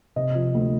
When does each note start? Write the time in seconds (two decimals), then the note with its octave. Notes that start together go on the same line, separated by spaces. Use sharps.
0.16 C3 D#5
0.35 F3
0.55 D2